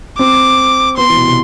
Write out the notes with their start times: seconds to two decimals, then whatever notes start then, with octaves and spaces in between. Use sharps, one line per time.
0.19 C4 D6
0.97 B3 C6
1.09 E3
1.16 B2
1.23 C3